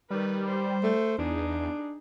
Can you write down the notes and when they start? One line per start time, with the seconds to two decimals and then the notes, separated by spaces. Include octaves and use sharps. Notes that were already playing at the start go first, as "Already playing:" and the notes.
0.10 D#3 G3 B4
0.47 C5
0.83 A3
1.18 E2 D4 D#4 G#4